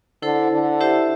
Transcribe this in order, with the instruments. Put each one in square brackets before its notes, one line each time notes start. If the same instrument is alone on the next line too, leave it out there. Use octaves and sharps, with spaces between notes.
[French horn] D3 [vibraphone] E4 A4 C5
[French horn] D3
[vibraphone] E4 G4 C5 E5